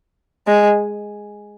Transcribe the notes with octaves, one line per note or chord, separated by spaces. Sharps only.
G#3